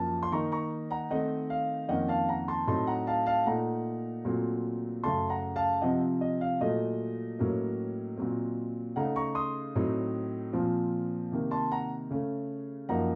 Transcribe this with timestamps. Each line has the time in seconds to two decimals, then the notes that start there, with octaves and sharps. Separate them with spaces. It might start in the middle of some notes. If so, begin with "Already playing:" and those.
Already playing: F#2 F3 A#3 C#4 A5
0.23 C6
0.32 D#3 A#3 D#4 A#5 C#6
0.52 A#5 C#6
0.91 F#5 A#5
1.10 D#3 A3 C4 D#4 D#5 F#5
1.50 F5
1.89 F2 D#3 A#3 C#4 D#5 F#5
2.08 F5 A5
2.29 F#5 A#5
2.48 A5 C6
2.67 A2 F#3 C4 D#4 A5 C6
2.87 F#5 A#5
3.07 F5 A5
3.26 F5 A5
3.46 A#2 A3 D#4 F#5 A#5
4.25 A#2 F#3 A3 C4
5.03 F#2 C#3 A3 A5 C6
5.30 F#5 A#5
5.56 F5 A5
5.82 C3 F3 C4 D#5 F#5
6.21 D#5
6.41 F5
6.60 A#2 F#3 A3 D#5
7.39 A2 F#3 A#3 C#4
8.17 A#2 F#3 C4
8.96 C#3 A3 D#4 F#5 A#5
9.16 A#5 C#6
9.35 C6 D#6
9.75 A2 F#3 C4 D#4
10.53 A#2 F3 C4
11.32 C3 D#3 A#3
11.51 A5 C6
11.72 F#5 A#5
12.10 C#3 A3 C#4
12.89 F#2 F3 A#3 D#4 F#5 A#5